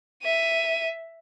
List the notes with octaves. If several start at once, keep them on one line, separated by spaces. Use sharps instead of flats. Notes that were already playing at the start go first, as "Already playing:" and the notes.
E5 D#7